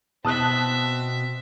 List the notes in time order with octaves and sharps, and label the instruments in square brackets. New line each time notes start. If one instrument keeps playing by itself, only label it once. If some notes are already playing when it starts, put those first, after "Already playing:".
[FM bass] B2 [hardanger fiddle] C4 E5 [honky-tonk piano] A5 D#6 F#6